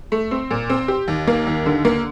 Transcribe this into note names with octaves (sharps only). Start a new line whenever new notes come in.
A3
C4
A#2
C4
G4
D#2
A#3
D#2
D3
A#3